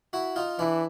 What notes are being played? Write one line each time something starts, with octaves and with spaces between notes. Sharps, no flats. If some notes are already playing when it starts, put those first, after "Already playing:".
E4 F#4
D#4 F4
E3 D4 E4